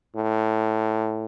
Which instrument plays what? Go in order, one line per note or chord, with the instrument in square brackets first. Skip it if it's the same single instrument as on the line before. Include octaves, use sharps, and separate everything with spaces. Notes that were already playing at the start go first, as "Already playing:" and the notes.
[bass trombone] A2